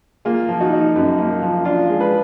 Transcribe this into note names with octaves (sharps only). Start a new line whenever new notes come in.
A#3 F4 G#4
F3
D#4 F#4
D#4
F#2
A#3
F3
D4 F4
G#3
G#4 B4